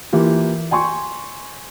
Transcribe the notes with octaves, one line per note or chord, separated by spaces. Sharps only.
E3 A#3 F4 G4
G5 G#5 C6 C#6